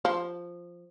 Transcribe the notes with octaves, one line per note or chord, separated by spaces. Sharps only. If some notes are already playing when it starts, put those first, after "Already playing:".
F3